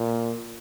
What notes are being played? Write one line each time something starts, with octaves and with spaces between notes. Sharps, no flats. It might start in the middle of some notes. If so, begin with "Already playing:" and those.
Already playing: A#2